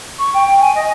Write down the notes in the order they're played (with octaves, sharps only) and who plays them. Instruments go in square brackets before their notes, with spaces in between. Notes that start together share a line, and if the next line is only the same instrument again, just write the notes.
[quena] C#6
G5
G#5
D#5